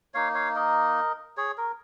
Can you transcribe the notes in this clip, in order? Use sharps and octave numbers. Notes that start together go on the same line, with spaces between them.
A#3 D#4 C#5 F5
C#5 F5
A#4 D#5
G#4 C#5
A#4